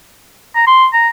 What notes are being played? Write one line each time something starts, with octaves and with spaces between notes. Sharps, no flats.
A#5
C6
A#5